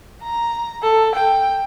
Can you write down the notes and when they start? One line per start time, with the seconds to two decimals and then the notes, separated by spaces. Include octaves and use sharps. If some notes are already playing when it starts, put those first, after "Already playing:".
0.22 A#5
0.83 A4
1.16 G5